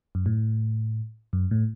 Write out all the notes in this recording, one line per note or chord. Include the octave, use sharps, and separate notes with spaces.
F#2
A2
F#2
A2